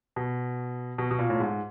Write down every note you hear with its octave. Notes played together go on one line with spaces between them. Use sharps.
B2
B2
B2
A#2
A2
G#2